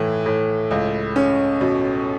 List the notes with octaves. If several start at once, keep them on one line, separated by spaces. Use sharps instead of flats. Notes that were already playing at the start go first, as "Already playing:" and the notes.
Already playing: A2 E3
A2
C#2
C#4
B2